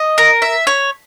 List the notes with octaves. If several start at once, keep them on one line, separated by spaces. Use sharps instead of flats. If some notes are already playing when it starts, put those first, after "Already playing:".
Already playing: D#5
A#4
E5
C#5